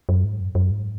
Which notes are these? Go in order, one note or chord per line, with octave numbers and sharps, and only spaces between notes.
F#2
G#2
F#2
F#2
G#2